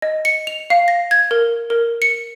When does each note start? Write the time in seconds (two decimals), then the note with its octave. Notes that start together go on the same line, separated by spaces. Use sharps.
0.02 D#5
0.25 C#7
0.47 F7
0.70 F5
0.88 A#6
1.11 G#6
1.31 A#4
1.70 A#4
2.02 C#7